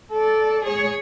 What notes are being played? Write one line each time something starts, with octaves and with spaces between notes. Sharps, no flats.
A4 D5
G#4 C#5